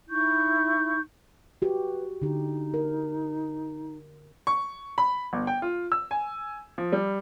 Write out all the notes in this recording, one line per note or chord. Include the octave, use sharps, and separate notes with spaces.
D#4 E4 C#6 G6
F#4 G4 B4
D3 D#4 G4
A#4
C#6
B5
G1
G5
F4
E6
G#5
F3
G3